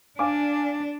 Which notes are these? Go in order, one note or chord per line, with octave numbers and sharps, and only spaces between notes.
D4 F5 G#5 D6